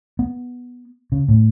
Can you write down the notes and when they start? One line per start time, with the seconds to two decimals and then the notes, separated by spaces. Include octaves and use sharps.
0.19 B3
1.12 C#3
1.28 A2